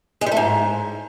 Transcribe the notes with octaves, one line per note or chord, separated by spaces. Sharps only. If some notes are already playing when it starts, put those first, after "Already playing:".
G#3
G3
A3
G#2